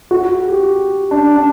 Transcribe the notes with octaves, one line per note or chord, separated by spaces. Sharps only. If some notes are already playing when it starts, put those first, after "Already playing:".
F#4
G4
D4
D4